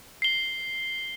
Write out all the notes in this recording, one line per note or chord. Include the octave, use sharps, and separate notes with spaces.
C7 G7